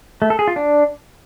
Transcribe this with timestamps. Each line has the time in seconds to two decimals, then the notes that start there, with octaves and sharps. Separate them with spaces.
0.22 A3
0.30 A4
0.39 G#4
0.48 F4
0.56 D4